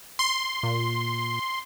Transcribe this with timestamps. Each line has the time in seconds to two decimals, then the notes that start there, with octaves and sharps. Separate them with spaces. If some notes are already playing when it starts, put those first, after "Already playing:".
0.19 C6
0.63 A#2